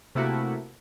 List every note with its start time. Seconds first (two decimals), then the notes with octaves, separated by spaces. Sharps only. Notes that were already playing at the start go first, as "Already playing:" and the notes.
0.15 C3 A3 A#3 E4 F#4